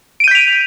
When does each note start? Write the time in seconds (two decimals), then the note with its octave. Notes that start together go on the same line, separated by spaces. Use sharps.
0.20 D7
0.24 D#7
0.28 G6
0.31 B6
0.35 F7